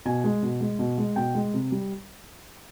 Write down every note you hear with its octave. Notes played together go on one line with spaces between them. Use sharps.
B2 G#5
G#3
B2
G#3
B2
G#3
B2 G5
G#3
C3
G3